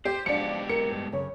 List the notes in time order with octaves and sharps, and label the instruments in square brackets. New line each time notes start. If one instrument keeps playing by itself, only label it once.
[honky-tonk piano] G4 [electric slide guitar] C5
[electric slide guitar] G#2 B2 G4 [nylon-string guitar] F3 F5 [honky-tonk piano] D4 C#7
[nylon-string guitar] A#4 [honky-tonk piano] C#7
[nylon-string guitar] G2
F#2 C#3 C#5